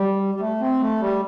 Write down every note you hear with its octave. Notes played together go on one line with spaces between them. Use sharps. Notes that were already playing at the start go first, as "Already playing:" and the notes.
Already playing: G3
G3
A3
C4
A3
G3